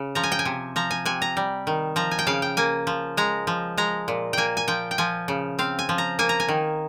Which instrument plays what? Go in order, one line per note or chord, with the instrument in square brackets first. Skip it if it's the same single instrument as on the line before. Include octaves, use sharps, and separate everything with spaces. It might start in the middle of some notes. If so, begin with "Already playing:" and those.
Already playing: [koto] C#3
F3 A#5
G#5
G5
G#5
C3
F3 A#5
G#5
C3 G#5
A#5
G3
D#3
F3 A#5
G#5
G5
C#3 F5
G5
A#3 G#5
F3
G#3 A#5
F3
G#3 A#5
A#2
A#3 G5 G#5
G#5
F3 G5
G5
F3 G#5
C#3
C4 F5
G#5
F3
A#5
A#3 G#5
A#5
G#5
D#3